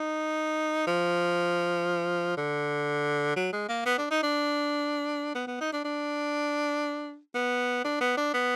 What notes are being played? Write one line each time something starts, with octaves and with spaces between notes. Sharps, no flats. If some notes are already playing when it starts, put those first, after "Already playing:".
Already playing: D#4
F3
D3
F#3
G#3
A#3
B3
D4
D#4
D4
B3
B3
D#4
D4
D4
B3
D4
B3
D4
B3